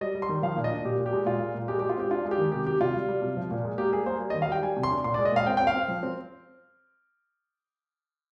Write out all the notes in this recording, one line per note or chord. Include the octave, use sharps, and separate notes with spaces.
G3 D#5
G3
C6
D#3
F3 F5
A#2
D#5
D4
A#2 G4
A#2
G4
G#3
A#2 F4
G#3
A#2
G#3 G4
G4
G#3
F4
C4 G4
D4 F4
G#3
G4
D#3
C3 G4
C3 G4
C3 F4
G3
G3
C3
F3
A#2
G#3
A#3 G4
G3 G#4
A#3 C5
G3
D#5
D#3
F5
G3 G5
G3 G#5
C3
C6
D4
A#2 C6
D5
G#3
D#5
A#2 F5
C4 G5
C4 G5
F5
C4
F3
C4